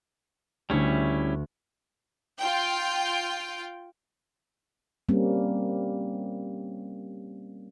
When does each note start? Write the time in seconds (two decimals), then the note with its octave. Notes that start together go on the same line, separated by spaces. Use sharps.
0.70 D2 G3 A3 C#4 E4 C#6
2.39 F4 G5
5.09 G3 A#3 C4 C#4